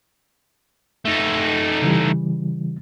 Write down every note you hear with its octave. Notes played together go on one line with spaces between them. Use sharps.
A3 D#4
C#3 E3 G3